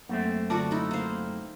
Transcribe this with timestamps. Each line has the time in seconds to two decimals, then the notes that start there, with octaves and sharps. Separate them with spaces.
0.09 F#2 A3 A#3 C4
0.50 D3 F4 F#4 D5 A5 A#5
0.71 D#4 E4
0.91 A#3 C5